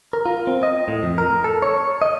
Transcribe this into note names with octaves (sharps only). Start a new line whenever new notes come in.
A#4
F4
C4
D#5
A2
F2
A#4
A4
C#5
D#5